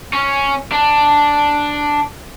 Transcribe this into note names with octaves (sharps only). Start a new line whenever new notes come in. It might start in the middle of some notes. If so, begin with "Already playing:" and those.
C#4
D4